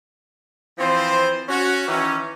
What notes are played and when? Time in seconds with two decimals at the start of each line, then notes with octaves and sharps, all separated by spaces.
0.79 E3 F3 C4 F4 C5
1.49 C#4 F#4
1.88 D#3 E3 C#4